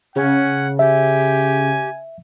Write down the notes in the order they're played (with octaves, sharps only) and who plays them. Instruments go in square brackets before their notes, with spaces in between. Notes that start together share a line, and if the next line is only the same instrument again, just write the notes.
[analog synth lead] C#3 [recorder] C#4 [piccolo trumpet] F#5
[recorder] G4 [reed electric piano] E5 [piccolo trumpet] G#5